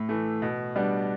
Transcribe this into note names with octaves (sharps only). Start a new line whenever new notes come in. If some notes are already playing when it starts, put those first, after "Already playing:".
Already playing: A2
E3 A3
B2
G3 B3 D4